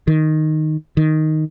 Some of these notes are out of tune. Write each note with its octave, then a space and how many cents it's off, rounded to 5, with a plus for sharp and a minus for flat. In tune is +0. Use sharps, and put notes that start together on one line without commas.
D#3 -5
D#3 +0